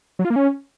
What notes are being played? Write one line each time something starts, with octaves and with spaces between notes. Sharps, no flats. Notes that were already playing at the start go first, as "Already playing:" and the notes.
F#3
F4
A#3
C#4